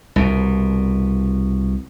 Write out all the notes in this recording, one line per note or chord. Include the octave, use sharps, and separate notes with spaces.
C2 B2